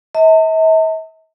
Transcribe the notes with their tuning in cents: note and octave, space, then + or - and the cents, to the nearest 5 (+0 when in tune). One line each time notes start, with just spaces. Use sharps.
E5 -45 A5 +45